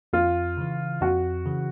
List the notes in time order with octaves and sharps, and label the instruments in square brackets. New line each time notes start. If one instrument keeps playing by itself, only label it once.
[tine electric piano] F2 [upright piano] F4
[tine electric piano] C#3 E3
[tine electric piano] F2 [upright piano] F#4
[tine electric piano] C#3 E3